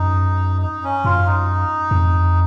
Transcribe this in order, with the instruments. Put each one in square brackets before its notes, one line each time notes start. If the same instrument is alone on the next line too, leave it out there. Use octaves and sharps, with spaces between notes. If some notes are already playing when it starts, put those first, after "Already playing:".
Already playing: [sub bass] F#2 [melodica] D#4
[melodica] D#4
C#4
[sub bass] F#2 [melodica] F4
[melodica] D#4
[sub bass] F2